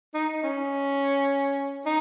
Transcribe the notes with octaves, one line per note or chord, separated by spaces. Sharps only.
D#4
C#4
D#4